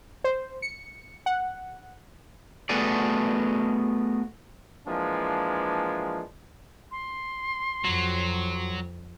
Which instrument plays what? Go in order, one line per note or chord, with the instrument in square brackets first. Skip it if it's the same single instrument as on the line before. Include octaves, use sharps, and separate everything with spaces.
[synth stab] C5
C#7
F#5
[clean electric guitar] A3 B3 F#4 G#4 A4 D5
[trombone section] E3 F3 G#3 A#3 D4
[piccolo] C6
[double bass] F2 [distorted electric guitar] F#3